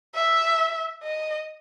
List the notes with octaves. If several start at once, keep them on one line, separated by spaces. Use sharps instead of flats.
E5
D#5